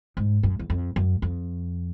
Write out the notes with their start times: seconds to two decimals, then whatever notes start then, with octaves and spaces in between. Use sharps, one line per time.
0.17 G#2
0.43 F#2
0.59 E2
0.70 F2
0.96 F#2
1.22 F2